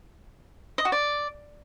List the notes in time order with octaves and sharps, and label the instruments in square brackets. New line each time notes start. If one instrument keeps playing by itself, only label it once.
[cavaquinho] D#5
F#4
D5